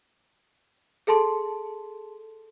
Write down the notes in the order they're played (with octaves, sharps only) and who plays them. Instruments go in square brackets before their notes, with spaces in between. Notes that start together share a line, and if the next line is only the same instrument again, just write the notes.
[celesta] G#4 A4 A5 C6